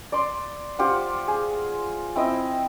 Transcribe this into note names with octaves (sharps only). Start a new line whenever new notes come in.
D5 C6
F4 G4 C5 F#5
G#4
C4 E4 D#5 G5